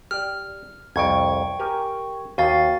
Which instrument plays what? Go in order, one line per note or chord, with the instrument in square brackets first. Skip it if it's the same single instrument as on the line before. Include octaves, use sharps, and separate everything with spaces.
[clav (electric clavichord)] G4 D5 [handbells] F6
[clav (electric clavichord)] C2 F2 [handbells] G5 C#6 G#6
[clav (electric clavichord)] G4 A#4 G#5
[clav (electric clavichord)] D#2 [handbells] F#4 F5 A6